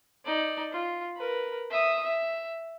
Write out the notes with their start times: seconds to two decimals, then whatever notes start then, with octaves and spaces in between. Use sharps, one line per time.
0.25 D#4 D5
0.72 F4
1.17 A#4 B4
1.70 E5 D#6
2.03 E5